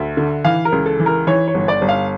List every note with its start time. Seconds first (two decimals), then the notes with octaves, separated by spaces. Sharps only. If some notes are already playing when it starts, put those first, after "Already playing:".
Already playing: D2 E5
0.17 D3
0.45 E3 F5
0.65 A#4
0.72 C#2
0.86 A4
1.00 E3
1.06 A#4
1.27 E3 C#5
1.48 C#5
1.54 G1
1.68 D5
1.82 G1
1.89 F5